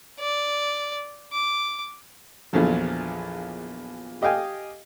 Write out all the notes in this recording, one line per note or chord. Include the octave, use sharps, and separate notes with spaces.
D5
D6
A#1 E2 D3 F3 F#3
G4 D#5 F5 G5 G#5